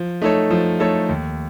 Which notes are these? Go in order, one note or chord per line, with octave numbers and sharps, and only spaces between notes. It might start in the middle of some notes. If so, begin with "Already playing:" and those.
Already playing: F3
A3 D#4 A4 C#5
F3
A3 D#4 A4 C#5
D#2